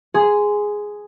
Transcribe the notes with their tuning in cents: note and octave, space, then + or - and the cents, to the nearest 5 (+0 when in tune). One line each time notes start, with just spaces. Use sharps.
G#4 +0 C6 -15